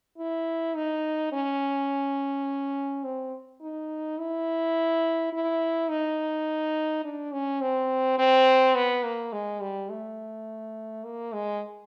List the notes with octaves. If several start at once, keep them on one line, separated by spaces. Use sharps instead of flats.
E4
D#4
C#4
C4
D#4
E4
E4
D#4
D4
C#4
C4
C4
B3
A#3
G#3
G3
A3
A#3
G#3